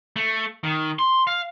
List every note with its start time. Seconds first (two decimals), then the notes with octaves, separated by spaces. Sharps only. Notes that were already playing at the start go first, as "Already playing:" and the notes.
0.16 A3
0.64 D#3
0.99 C6
1.27 F5